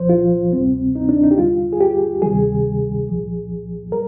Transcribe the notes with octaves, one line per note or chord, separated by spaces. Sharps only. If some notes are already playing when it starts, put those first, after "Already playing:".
Already playing: C2 A#2 F3 C5
F4
D2 C3 G3 C4
D#4
D4
D#4
G4
D#2 D3 G3 F4
G#4
G4
D2 C3 D#3 G3 G#4
C2 A#2 F3
G3 A#4